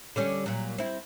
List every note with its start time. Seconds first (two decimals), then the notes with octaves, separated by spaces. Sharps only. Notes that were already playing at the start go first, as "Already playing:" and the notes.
0.16 D3 G3 C#4
0.46 A#2 F#3
0.78 C4 E4